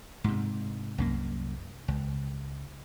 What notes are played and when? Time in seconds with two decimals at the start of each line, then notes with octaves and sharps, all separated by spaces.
0.24 G#2 C3
0.98 C2 F#2 A#3
1.88 C#2